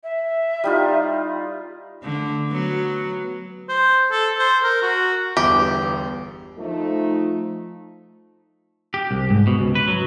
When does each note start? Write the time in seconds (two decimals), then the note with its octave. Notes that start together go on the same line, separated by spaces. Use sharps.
0.03 E5
0.64 G3 D#4 F4
2.03 D3 A3
2.50 F#3 B3
3.69 C5
4.12 A4
4.39 C5
4.63 A#4
4.83 F#4
5.37 G1 E2 B3 G4
6.57 F3 A3 D#4
8.94 G4
9.11 C2
9.30 G#2
9.47 B2
9.59 C#2
9.75 B4
9.88 F#3